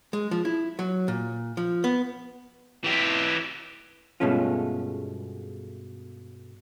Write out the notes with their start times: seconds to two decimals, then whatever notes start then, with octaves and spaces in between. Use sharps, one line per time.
0.13 G#3
0.31 F3
0.45 E4
0.79 F#3
1.08 A#2
1.57 F3
1.84 B3
2.84 E3 G4
4.20 G2 B2 G#3 A3 C#4 F4